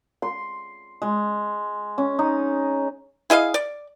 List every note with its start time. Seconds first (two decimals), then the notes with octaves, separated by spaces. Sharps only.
0.22 C6
1.02 G#3
1.98 C#4
2.19 D#4
3.30 E4 G#4 D#5 F5
3.54 D5